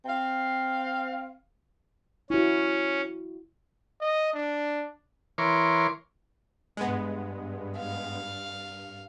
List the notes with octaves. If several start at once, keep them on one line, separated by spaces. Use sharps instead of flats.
C4 F5
C#4 E4 F#4
D#5
D4
E3 A#4 C#5 C6 D6
G2 G#3 B3
F5